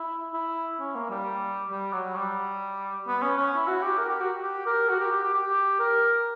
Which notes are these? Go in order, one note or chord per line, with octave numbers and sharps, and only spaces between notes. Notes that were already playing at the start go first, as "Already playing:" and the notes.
Already playing: E4
E4
C#4
A#3
G3
G3
F#3
G3
B3
C#4
C#4
E4
F#4
G4
A#4
G4
F#4
G4
A#4
F#4
G4
G4
G4
G4
A#4